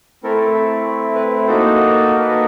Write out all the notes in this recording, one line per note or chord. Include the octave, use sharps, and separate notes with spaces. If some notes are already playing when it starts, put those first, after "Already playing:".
A3 C4 E4 A4 A#4
A4
B4
A#3 D#4 F#4 A4 C5
A#4
B4
A#4